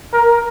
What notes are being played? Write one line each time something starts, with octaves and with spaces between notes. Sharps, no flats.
A#4